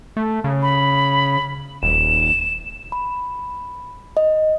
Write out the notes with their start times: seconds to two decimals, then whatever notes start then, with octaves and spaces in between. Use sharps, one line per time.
0.17 A3
0.44 C#3
0.62 B5
1.83 D#1 E7
2.92 B5
4.17 D#5